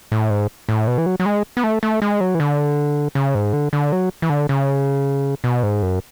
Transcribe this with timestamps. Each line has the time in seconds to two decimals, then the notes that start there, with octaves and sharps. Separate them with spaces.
0.12 A2
0.30 G#2
0.69 A2
0.87 B2
0.98 E3
1.06 F#3
1.20 F#3
1.26 G#3
1.57 B3
1.64 A3
1.83 A3
2.02 G#3
2.21 F#3
2.35 E3
2.40 D3
3.15 C#3
3.35 G#2
3.53 D3
3.73 D3
3.92 F#3
4.22 E3
4.30 D3
4.49 C#3
5.44 B2
5.63 G#2
5.82 F#2